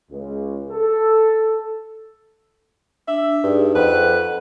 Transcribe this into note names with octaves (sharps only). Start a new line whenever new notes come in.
C#2
A4
D4 E5
G2 D#4 G#4 D5
F2 B4 F#5